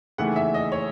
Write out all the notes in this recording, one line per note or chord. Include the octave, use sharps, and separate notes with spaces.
D#2 C#3 E3 A3 F#5
E5
D#5
C#5